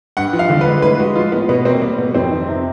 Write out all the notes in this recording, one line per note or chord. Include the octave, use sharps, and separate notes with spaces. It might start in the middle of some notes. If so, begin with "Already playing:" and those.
G2 F#5
F3
F5
D3
B4
G#3
A2 B4
G#3 F#4
F3 F4
A2 B3
B2 B3
A#3 C4
G3 B3
B2 B3
F2 C4
D#3
C3